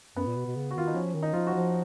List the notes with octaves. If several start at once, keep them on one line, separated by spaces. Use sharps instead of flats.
F#2 B3
A#2
B2
B2
C#3
F#4
D#3 F4
D#4
F3 C#4
D#3
D#4
F3 F4
F#4
F3